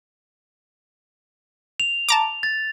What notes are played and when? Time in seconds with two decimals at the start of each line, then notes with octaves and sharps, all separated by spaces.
1.80 F7
2.09 A5 A#5 D6
2.43 A6